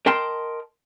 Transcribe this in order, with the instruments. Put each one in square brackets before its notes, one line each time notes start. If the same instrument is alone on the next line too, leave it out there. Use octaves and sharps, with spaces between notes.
[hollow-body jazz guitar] A#4 D#5 G5 A5 C6